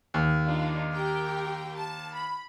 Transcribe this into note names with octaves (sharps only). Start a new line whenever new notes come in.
D#2
D4 D#4 F4
G4 A#4 G5
A5
B5